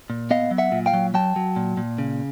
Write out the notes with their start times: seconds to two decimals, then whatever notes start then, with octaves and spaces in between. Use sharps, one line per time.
0.10 A#2
0.31 B3 D#5 F5
0.51 F#3
0.58 E5 F#5
0.72 A#2
0.86 F5 G5
0.94 F#3
1.14 F#3 G5 A5
1.36 F#3
1.56 A#2
1.77 A#2
1.98 C#3